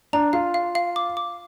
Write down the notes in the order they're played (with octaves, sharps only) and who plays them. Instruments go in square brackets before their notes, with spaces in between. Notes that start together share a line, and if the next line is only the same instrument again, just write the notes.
[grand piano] D4 [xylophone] A#5
[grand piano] F4 [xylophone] F5
[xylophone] F5
F5
D6
D6